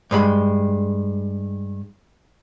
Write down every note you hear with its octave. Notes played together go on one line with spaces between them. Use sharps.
G2 G#3 B5